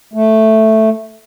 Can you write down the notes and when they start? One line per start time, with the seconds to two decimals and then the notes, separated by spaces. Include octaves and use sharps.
0.14 A3